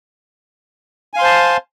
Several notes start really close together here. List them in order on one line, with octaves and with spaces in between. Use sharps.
G#5 F5 C6 C5 A5